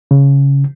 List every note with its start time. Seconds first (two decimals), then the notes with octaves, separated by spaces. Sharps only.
0.11 C#3